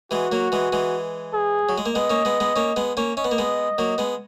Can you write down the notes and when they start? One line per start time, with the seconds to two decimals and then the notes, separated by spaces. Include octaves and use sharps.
0.11 E3 G#3 F#4
0.32 F#3 A#3
0.52 E3 G#3
0.72 E3 G#3
1.33 G#4
1.69 F#3
1.78 G#3
1.86 A#3
1.95 G#3 B3 D#5
2.10 A#3 C#4
2.25 G#3 B3
2.40 G#3 B3
2.56 A#3 C#4
2.76 G#3 B3
2.97 A#3 C#4
3.17 C#4 D#5
3.24 B3
3.31 A#3
3.38 G#3 B3
3.78 F#3 A#3
3.98 G#3 B3